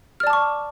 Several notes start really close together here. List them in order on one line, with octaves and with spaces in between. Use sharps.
F6 D5 A5 D6 C#6